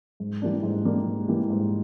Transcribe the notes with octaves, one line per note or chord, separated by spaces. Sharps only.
G#2
E3 G3 A#3 D4
G#2
E3 G3 A#3 D4
G#2
E3 G3 A#3 D4
G#2